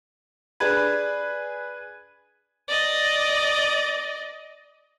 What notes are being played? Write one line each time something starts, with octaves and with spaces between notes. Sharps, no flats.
D4 G#4 B4 F#6 G#6 D#7
D5 D#5